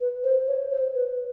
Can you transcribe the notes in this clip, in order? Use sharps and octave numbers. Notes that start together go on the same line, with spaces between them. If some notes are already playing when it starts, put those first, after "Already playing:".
B4
C5
C#5
C5
B4